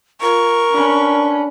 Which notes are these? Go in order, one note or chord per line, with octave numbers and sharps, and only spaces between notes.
F4 A#4 C#6
C#4 D4 B4